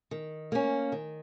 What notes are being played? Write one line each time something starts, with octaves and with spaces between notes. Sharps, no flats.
D#3
A#3 C#4
D#3